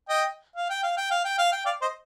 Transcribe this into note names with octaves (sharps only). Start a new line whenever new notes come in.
D#5 G5
F5
G5
F5
G5
F5
G5
F5
G5
D5 F5
C5 D#5